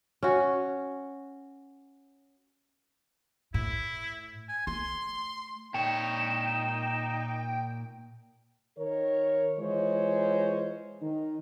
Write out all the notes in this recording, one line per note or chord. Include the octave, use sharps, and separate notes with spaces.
C#4 F#4
A2 E4
G#5
A3 C6
A#2 D#4 C#5 G5 E7
D#3 A#4 C#5
E3 G#3 F4 C5 C#5
D#3 D#4